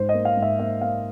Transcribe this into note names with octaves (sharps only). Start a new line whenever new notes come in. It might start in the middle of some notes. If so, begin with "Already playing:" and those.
Already playing: G#2 C5
D#5
A#3
F5
G#2
E5
A#3 E5
A#3 F5